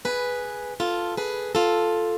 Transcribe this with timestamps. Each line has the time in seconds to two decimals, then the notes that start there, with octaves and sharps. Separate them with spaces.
0.05 G#4 B4
0.80 F4 A4
1.17 G#4 B4
1.55 F4 A4